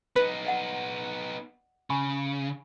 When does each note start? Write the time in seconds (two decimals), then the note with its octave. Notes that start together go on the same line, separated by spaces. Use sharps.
0.16 B3 D#4 B4
0.45 D5 D#5 F#5
1.90 C#3 G#5 B5 C#6